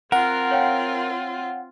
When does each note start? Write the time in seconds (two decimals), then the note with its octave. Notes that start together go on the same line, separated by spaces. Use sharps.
0.12 C4 F4 A#4 F#5
0.51 C#5 F5 G5